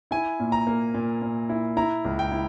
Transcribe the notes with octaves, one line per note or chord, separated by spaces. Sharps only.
E4 G#5
A#2
A#5
A#3
A#2
A#2
E4
E4 A#5
C#2
G5
E4